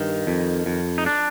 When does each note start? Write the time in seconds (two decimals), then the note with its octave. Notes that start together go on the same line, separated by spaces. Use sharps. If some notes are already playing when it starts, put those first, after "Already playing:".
Already playing: G2 D#3
0.27 F2
0.66 F2
0.98 D#4
1.06 D4